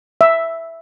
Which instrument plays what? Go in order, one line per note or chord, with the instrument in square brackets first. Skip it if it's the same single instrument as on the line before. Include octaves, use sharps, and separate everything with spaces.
[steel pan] E5